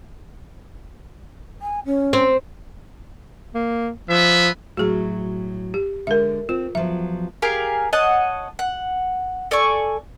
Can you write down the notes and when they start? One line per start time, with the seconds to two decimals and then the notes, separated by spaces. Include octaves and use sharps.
1.62 G#5
1.85 C#4
2.13 C4
3.55 A#3
4.09 F3 B3 E5 B5
4.77 A2 F#3 F#4 G#4
5.74 G4
6.07 D3 G#3 A#4 E5
6.49 C4 F4
6.75 E2 F3 F#3 E5
7.42 G4 G#4 A#4 F5
7.93 C#5 D#5 F#5 A5
8.59 F#5
9.51 A4 D5 G#5 C#6